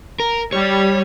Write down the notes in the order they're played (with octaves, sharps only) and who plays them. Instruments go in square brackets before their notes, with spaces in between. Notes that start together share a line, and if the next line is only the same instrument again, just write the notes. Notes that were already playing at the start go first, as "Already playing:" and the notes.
[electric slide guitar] A#4
[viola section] G3 [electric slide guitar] C#5